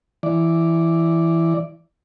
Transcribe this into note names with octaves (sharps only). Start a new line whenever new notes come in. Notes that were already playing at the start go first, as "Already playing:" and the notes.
E3 D5